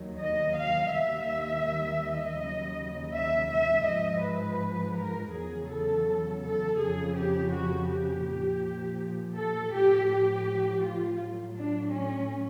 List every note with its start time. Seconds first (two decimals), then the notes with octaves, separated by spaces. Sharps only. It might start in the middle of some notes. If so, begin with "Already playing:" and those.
Already playing: D#2 D#3 F#3
0.19 D#5
0.56 F5
0.92 D#2 D#3 G3 E5
2.03 D#5
2.40 D#2 C#3 F#3
3.13 E5
3.49 E5
3.86 G#2 F3 D#5
4.23 B4
4.96 A#4
5.33 E2 C#3 F#3 G#4
5.69 A4
6.43 A4
6.79 F2 C#3 F3 G#4
7.17 G4
7.53 F#4
7.90 G4
8.26 A#2 F3
9.37 A4
9.73 A2 F3 G4
10.10 G4
10.83 F4
11.20 A2 F#3
11.57 D4
11.94 C#4